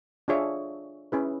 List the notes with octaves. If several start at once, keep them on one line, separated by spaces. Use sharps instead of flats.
D4 F4 G#4 C#5 E5
C#4 E4 G#4 B4